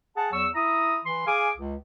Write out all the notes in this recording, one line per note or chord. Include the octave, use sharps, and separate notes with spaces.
G#4 F#5 A5
E2 F#3 C#6 E6
E4 E5 A#5 D#6
E3 C6
G#4 F5 G#5 D6
C#2